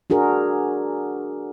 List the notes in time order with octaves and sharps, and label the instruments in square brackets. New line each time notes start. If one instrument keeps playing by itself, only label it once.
[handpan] D4 F#4 G#4 A#4